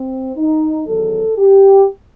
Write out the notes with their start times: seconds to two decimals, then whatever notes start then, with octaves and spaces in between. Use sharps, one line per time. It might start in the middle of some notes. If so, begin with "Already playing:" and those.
Already playing: C4
0.37 D#4
0.87 E2 D#3 F#3 A4
1.38 G4